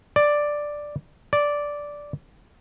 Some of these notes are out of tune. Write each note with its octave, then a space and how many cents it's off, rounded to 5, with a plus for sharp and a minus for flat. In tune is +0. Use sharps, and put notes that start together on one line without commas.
D5 +5
D5 -5